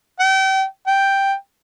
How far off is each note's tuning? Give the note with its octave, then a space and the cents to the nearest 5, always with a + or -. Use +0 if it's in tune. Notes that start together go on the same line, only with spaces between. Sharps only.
G5 -35
G5 +0